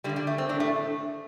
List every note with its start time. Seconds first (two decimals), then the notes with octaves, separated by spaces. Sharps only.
0.04 G2 D3 G3
0.16 G3
0.27 A3
0.38 C4
0.49 A2 D4
0.60 A3